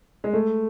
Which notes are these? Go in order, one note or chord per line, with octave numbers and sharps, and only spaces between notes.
G#3
A3